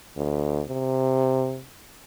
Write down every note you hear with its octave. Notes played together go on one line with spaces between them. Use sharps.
D2
C3